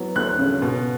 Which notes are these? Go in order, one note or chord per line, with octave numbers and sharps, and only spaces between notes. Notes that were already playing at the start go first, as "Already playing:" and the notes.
Already playing: E3 F#3 B3
D2 F#6
C#3
B2